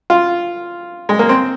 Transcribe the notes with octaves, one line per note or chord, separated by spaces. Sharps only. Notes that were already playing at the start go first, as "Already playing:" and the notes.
F4
G#3
A#3
C4